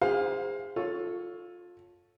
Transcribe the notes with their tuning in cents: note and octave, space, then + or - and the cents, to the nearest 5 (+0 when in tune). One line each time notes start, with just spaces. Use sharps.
G#4 -30 C5 -15 F5 +20
F4 +20 A4 +0 C#5 +0